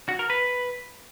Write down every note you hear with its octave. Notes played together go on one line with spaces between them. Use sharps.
F#4
A#4
B4